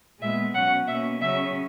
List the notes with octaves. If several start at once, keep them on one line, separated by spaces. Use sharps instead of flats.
A#2 G#3 B3 E5
B2 F#3 C#4 F#5
B2 A#3 C#4 E5
C#3 F#3 C#4 E5